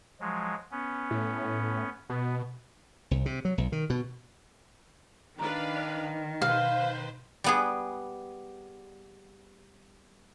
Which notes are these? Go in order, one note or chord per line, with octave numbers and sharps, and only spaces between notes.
F3 F#3 G#3
B3 C#4
A2
B2 B3
C2
C3
F#3
B1
D#3
B2
D#3 D4 B4 F5 A#5
B2 B4 C5 F5
G3 B3 G#4